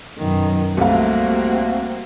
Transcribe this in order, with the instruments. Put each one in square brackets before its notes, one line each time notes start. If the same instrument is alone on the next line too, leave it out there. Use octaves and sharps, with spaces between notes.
[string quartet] F#2 B2 D#3
[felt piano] C2 A3 F5 [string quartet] A#3 C4 F#4